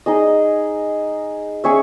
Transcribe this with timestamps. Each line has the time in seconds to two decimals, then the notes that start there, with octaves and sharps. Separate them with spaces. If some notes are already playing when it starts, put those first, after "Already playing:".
0.06 D#4 G#4 D#5
1.64 C#4 G#4 C#5 E5